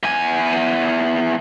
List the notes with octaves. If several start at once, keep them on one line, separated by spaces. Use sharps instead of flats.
E2 G#5